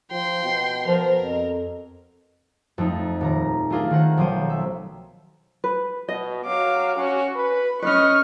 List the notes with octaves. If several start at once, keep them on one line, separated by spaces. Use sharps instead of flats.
F3 G5 C6
B2
F3 A#4
F2
F2 A3 D#4
D#1 A#5
A3 D4 F4 G#4 A#4
D#3 C5 F#5
B1 F3 F#3 C5 G5 D#7
E5
B4
B2 D#5
F#3 F5 D6
C#4 F#4
B4 B5
C#4 D4 B4 D#5 C#6 F6